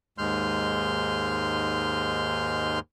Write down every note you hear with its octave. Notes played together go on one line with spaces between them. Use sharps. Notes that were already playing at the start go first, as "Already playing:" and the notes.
D#2 G#2 G#3 C6 F6 G6